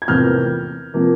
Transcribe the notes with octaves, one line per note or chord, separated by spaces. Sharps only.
G#6
F1 E2 C3 F3 A#3 F6 G6
C3 F3 A#3